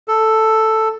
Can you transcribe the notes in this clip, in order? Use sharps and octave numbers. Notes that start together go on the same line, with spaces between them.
A4